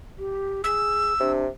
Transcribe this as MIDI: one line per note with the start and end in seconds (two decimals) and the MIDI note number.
0.18 0.62 67
0.64 1.13 68
0.64 1.32 88
1.20 1.48 48
1.20 1.44 62